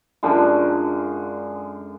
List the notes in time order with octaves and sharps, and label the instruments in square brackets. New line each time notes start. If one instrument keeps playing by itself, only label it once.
[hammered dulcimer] F#2 D3 G#3 F4